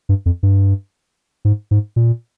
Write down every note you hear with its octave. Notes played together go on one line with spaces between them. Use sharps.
G2
F2
G2
G#2
G#2
A#2